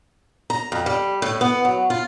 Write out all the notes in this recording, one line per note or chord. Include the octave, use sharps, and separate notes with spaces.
A#5
F2
G3
A2
B3
F#3
F4